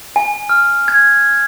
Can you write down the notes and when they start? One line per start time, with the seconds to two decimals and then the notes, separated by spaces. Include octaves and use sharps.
0.16 G#5
0.49 F6
0.88 G#6